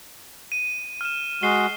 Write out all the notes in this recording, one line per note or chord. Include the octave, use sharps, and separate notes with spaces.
D#7
F6 E7
G#3 F#4 C7 G7